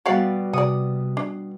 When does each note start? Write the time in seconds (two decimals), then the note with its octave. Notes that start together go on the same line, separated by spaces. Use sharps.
0.06 B2 G3 F#4 D5 F5 F#5
0.53 C3 F#4 D5 D#6
1.17 D4